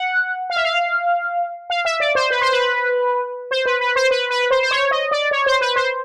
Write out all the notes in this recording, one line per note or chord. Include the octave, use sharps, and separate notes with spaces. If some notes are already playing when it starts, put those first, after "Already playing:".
Already playing: F#5
F5
E5
F5
F5
E5
D5
C5
B4
C5
B4
C5
B4
B4
C5
B4
B4
C5
C5
C#5
D#5
D5
C#5
C5
B4
C5